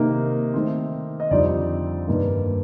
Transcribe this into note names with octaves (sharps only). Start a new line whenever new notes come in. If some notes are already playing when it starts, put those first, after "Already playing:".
Already playing: C3 D#3 A#3 D#4 D#5
D#3 A3 C4
D#5
F2 D3 G3 C4 D#4 D5
G2 D#3 A#3 D#4